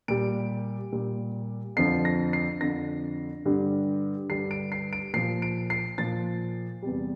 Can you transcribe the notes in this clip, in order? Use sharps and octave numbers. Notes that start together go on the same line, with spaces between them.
A#2 G3 D7
A#2 G3
F2 D3 F3 C7
A#6
C7
F2 D3 F3 A#6
G2 D3 G3
G2 D3 G3 C7
D7
C7
D7
A#2 F3 C7
D7
C7
A#2 F3 A6
E2 C3 G3